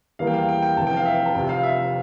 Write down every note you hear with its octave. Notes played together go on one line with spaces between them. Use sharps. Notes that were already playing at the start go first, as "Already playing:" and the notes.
E2 E3 G3 A#3 F5
G5
F5
G5
G5
F1 E2 E3 A5
G5
F5
E5
G5
A5
F1 F2 C3 G5
F5
E5